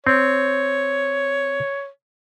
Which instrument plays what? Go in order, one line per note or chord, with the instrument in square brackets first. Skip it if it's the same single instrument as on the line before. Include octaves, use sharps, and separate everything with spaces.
[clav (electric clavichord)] C4 [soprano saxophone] C#5